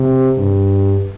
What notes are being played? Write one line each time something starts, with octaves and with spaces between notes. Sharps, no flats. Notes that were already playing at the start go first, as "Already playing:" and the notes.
Already playing: C3
G2